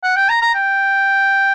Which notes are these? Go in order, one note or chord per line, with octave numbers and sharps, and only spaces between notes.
F#5
G5
A#5
A#5
G5